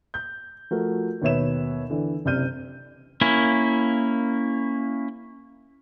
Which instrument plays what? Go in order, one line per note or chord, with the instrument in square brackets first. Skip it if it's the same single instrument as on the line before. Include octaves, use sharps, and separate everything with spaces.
[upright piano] G6
F3 A3 F#4 A#4
D#2 B2 B4 C#5 E5 E7
D3 E3
F#1 C3 D5 F6 G6 D#7
[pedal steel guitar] A#3 C#4 E4